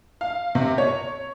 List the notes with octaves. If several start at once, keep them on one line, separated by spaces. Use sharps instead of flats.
F5
C3
C#5